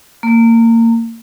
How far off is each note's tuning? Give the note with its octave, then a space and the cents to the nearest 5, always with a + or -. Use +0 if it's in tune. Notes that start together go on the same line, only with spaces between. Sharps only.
A#3 -30